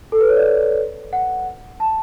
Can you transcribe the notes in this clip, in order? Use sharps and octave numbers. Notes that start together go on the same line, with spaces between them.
A4
B4
C#5
D5
F#5
A5